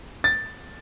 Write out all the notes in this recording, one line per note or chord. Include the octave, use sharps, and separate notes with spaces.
A6